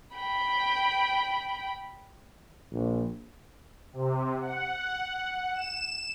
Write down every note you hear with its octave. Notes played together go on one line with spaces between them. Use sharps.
G5 B5
A#1
C3
F#5
E7